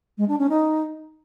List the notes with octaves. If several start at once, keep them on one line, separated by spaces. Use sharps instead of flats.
G#3
D4
C#4
D#4